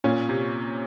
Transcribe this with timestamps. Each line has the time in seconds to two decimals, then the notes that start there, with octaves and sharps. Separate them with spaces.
0.04 A#2 C#4
0.29 C3